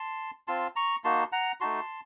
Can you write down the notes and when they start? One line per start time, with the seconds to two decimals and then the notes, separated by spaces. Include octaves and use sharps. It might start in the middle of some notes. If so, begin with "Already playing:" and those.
Already playing: A5 C6
0.48 C4 F4 A5 C6
0.76 A#5 C#6
1.04 A#3 D#4 F#4 A5 C6
1.32 F#5 A#5
1.60 A3 D#4 F#4 A5 C6